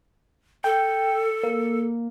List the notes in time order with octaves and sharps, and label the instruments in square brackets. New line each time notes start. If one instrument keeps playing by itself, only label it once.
[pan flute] A4 [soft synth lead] G5
[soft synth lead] A#3